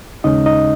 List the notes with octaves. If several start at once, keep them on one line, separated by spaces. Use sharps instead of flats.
D#2 C#3 G#3 C#4 D#4 D#5
D#4 D#5